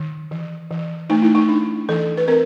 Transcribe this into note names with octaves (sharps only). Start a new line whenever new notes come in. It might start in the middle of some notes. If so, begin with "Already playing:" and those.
Already playing: D#3
E3
E3
A3 D#4
E4
D#4
D4
E3 A4
B4
C4 A#4